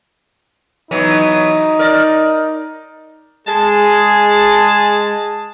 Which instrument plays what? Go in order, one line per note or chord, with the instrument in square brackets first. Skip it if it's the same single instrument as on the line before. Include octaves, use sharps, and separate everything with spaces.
[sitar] E3 F#3 B3 [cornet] D#4
[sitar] A#4 D5
[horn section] G#3 A5 [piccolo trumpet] G#4